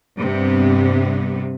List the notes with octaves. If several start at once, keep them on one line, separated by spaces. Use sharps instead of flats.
G2 C3 B3